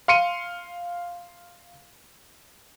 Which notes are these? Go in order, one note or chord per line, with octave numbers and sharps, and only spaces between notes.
F5 C6 C#7 D#7